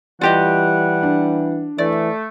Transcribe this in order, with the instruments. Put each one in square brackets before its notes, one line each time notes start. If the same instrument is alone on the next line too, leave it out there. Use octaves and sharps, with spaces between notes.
[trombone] E3 [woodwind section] G3 F#5 [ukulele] F4 G4 D#5
[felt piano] D4
[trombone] E3 [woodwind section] A3 [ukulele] D5